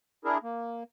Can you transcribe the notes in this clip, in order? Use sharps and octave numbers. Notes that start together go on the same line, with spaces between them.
D4 E4 G#4 A#4
A#3